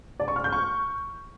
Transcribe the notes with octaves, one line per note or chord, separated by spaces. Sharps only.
D5
C#6
F6
G6
C#6